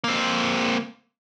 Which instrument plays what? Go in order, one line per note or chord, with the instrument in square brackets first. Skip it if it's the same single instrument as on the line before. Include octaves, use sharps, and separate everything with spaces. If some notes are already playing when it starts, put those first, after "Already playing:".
[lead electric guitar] A#3 C4